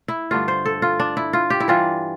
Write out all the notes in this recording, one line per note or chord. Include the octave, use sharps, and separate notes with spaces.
E4
G2 D3 A3 D4 F4
C5
A4
F4
D4
E4
F4
G4
E4
E3 G3 D4 F4